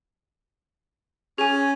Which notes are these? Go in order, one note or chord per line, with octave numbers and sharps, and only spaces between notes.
C#4 G#4 G#5